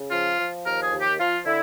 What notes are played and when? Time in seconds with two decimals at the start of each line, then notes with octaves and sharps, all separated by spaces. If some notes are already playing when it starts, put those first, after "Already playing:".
Already playing: C#3
0.11 F3 F4
0.38 F3
0.66 D#2 A#4
0.83 G#4
0.92 D#2
1.01 G4
1.19 F3 F4
1.46 D3 E4